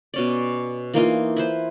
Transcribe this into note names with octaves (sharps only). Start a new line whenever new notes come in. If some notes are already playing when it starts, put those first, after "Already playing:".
B2 C#4 D5
E3 A#3 D#4 F4
E4 B4 C5